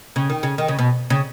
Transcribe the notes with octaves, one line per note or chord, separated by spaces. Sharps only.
C#3
D#3
C#3
D#3
C#3
B2
C#3